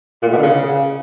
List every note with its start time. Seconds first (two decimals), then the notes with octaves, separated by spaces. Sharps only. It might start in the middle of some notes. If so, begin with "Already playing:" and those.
0.22 A#2
0.27 A2
0.33 B2
0.38 D3
0.43 C#3